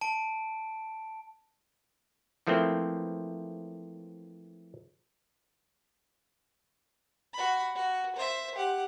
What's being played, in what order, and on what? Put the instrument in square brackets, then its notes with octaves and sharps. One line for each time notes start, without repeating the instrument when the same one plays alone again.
[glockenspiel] A5 D7
[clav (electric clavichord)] E3 F3 A3 A#3 C4
[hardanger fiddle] F#4 B5
F#4
C5 E5
G4 F#5